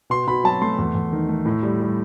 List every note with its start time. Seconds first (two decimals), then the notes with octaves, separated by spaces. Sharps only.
0.10 B2 C6
0.27 B2 B5
0.44 F#3 A5
0.62 A3 C6
0.78 E2
0.95 E2
1.13 D#3
1.29 A3
1.45 A2
1.63 G3
1.80 G3